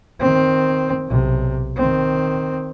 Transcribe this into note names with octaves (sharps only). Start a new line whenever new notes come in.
D#3 C4
B1 C3
D#3 C4